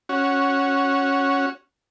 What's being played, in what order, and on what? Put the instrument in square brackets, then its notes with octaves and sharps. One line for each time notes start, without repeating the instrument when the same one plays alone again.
[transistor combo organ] C#4 F#4